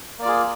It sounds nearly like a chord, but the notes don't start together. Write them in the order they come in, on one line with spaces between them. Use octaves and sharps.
A#3 D5 F4 G#4